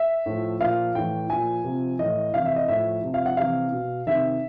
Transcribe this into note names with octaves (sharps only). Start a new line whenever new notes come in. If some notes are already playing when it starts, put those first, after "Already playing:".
Already playing: E5
A2 F3
A#2 F3 F5
A2 E3 G5
A#2 F3 G#5
C3 F3
A2 E3 D#5
C3 E3 F5
E5
D#5
A2 F3 E5
C3 F3
F5
F#5
C3 E3 F5
B2
C3 D#3 E5